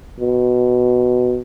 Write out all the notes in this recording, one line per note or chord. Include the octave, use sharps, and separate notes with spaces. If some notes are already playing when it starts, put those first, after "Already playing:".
B2